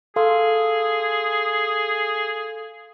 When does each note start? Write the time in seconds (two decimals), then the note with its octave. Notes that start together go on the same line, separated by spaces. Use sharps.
0.16 G#4 A4 F5 C6